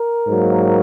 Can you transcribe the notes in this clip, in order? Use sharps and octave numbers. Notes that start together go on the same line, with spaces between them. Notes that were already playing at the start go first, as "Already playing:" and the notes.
Already playing: A#4
G#2 F#3 A#3